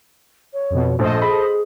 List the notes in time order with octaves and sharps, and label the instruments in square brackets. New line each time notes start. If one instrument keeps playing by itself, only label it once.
[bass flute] C#5
[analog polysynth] F2 B2
[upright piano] A#1 [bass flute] A3 [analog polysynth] A4 C5 D#5
[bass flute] G#4 [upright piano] B5